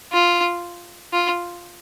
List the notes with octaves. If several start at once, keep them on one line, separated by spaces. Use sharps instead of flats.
F4
F4